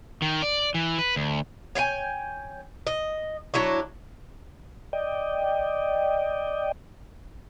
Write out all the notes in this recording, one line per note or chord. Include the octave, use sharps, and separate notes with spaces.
D#3
D5
E3
B4
D2
C#5 F5 G5 G#5
D#5
F#3 D4 E4 C#5
D5 D#5 G5